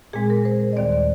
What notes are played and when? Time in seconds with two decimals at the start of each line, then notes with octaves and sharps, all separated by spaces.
0.13 A#2 G#3 C4 G#4
0.30 A#4
0.45 C5
0.60 C5
0.73 D#5
0.76 D#2 D#3 G3 C4 D5
0.92 D5